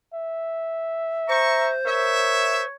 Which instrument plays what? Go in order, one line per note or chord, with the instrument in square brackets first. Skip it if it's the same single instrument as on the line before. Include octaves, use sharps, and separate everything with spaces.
[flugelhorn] E5
[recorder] C5 [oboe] A#5 [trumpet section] C#6
[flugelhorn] A#4 [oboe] C#5 [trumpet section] E5